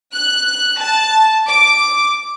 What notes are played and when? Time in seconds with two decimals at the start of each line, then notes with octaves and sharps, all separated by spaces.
0.13 F#6
0.80 A5
1.47 D6